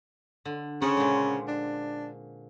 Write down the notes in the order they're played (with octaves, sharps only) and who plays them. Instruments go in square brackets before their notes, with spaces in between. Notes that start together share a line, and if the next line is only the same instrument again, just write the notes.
[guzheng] D3
[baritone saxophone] C#3 [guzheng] C4 C#4 F#5
[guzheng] A#2 D3 G#3
[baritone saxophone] D4